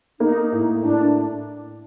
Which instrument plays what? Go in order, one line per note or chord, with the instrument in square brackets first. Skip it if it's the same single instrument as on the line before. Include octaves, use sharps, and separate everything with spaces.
[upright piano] A#3 [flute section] D#4
[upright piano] A2
[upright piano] A2 [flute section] D4